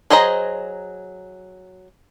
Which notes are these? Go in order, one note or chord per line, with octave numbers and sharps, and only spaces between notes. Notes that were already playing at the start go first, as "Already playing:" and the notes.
F#3 G#4 C5 D#5 A#5